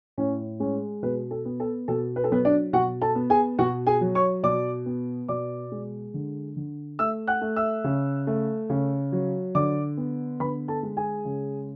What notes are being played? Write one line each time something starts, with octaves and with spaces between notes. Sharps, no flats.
A2 C#4 C#5
G#3 C#4 C#5
B2 B3 B4
A4
B3
A4
B2 A4
B4
A4
F#3 B3 B4
D4 D5
B2 F#4 F#5
A4 A5
B3
G#4 G#5
B2 F#4 F#5
G#4 G#5
F#3
C#5 C#6
B2 D5 D6
B3
B2 D5 D6
G#3
D3
D3
A3 E5 E6
F#5 F#6
A3
E5 E6
C#3
A3
C#3
F#3
D3 D5 D6
B3
D3 B4 B5
A4 A5
G#3
G#4 G#5
C#3